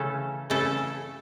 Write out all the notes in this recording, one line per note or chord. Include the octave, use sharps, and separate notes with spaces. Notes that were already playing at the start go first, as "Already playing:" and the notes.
Already playing: C#3 E3 A3 C#4 A4
C#3 E3 A3 C#4 A4